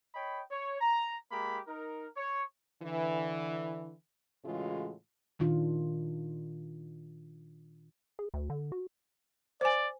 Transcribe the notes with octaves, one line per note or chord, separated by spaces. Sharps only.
C#5 D#5 G5 B5
C#5
A#5
G#3 A#3 G4 A#4 B5
D#4 A#4
C#5
D3 E3
A2 C#3 E3 G#3 F4 F#4
A#2 D#3 D4 F4
G#4
D2
D3
F#4
C5 D5 G#5